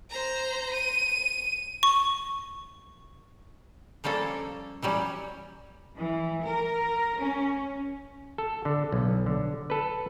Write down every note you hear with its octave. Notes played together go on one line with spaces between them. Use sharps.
C5 A#5
D#7
C#6
F3 G3 A#3 C#4 A4
E3 F#3 G3 C#4
E3
A#4
C#4
A4
D3
B1
D3
A4 B4